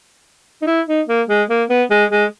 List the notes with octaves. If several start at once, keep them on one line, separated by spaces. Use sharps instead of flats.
D#4
E4
D#4
A#3
G#3
A#3
B3
G#3
G#3